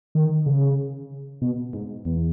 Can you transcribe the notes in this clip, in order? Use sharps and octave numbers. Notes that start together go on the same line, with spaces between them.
D#3
C#3
B2
G#2
E2